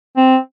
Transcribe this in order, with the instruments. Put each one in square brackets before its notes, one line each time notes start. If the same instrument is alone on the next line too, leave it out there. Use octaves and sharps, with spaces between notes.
[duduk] C4